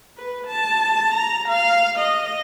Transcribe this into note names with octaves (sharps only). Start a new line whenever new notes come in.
B4
A5
A#5
F5
D#5